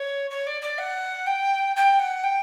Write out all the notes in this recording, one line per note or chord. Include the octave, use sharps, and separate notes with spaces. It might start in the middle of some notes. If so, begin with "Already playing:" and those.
Already playing: C#5
C#5
D5
D5
F#5
G5
G5
F#5
G5